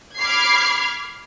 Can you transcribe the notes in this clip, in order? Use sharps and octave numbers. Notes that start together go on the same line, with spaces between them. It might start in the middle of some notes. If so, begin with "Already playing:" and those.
B5 D6 F6 G#6 C7